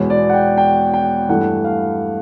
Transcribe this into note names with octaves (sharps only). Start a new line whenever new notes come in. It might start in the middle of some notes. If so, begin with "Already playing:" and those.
Already playing: E2 B2 G#3 C#5
D5
F#5
G5
G5
G5
G2 E3 A3 F#5
F5